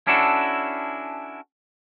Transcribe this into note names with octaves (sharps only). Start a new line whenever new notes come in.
C#4 D4 E4 F#4 A4